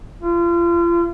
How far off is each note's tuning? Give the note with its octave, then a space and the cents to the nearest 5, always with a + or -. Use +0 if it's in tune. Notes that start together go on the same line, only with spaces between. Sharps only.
F4 -35